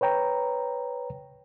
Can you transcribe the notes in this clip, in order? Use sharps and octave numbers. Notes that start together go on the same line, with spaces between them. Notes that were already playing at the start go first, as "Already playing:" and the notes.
B4 C#5 G5 A#5